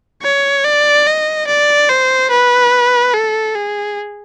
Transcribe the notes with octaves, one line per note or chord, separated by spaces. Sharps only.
C#5
D5
D#5
D5
C5
B4
A4
G#4